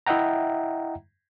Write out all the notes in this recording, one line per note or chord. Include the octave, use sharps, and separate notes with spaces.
E4 D#5 E5 F#5 G5 A#5